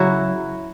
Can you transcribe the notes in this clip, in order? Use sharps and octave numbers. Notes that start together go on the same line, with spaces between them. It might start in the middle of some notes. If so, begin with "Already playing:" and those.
Already playing: C#3 F#3 E4 F#4